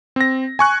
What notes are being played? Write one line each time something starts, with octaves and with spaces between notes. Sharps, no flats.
C4 A#6
G#5 C#6 F#6